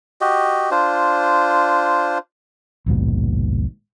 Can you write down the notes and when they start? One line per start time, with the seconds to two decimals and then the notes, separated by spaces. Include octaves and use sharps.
0.21 F#4 G4 D#5
0.71 D4 F4 C5
2.86 A#1 D#2 G#2 B2